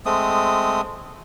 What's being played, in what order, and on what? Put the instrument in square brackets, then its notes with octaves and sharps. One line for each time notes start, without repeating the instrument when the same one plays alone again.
[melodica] G#3 A3 C4 D#6